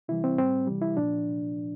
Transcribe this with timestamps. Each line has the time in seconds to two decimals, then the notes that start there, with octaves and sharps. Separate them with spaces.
0.08 C3 E3 G3 E4
0.24 C4
0.38 A2 G3 C4
0.67 C3 E3 G3
0.82 E4
0.96 A#2 F3 D4